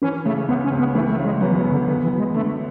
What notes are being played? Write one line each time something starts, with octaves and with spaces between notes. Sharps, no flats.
E3 C#4
C#3 A3
C#2 B3
C#4
C#2
B3
E3 A3
A3
C#3
G#3
F#3 B3
E3
F#3
F#2
D3
D3 B3
E3
F#3
G#3
D3 A3